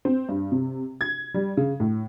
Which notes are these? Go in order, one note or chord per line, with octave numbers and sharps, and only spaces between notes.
C4
G2
C3
G#6
G3
C#3
A2